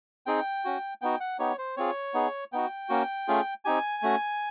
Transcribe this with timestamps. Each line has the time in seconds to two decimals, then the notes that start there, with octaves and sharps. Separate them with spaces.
0.26 C4 D#4 G#4 G5
0.65 C#4 F#4
1.02 B3 D#4 F#4 G5
1.20 F#5
1.39 B3 D#4 G4 C#5
1.58 C5
1.77 C4 F4 G#4 C#5
2.14 B3 D#4 G#4
2.53 B3 D#4 F#4 G5
2.89 A#3 C#4 F#4
3.28 A3 C#4 F4 G#4
3.65 C4 D#4 G4 G#5
4.03 A3 C#4 F#4